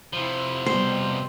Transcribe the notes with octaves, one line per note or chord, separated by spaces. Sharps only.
C3 F3 E4
B2 G3 C4 C5